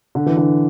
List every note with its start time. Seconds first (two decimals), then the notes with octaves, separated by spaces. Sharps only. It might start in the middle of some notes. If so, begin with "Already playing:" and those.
0.15 D3
0.26 E3
0.37 D3